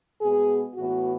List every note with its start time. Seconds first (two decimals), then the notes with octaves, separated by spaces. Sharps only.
0.21 B2 G#3 B3 G#4
0.75 A2 E3 B3 F#4